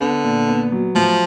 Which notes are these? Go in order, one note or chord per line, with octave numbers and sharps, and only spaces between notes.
D3 B3
A#2
B3
F#3
A2 F3